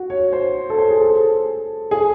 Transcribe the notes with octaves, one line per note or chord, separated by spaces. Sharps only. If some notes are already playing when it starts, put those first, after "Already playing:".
Already playing: F#4
C#5
C5
A4
C5
G#4
A4
G#4